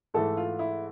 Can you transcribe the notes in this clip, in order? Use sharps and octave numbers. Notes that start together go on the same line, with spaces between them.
G#2 E3 A3 A4
F4
E4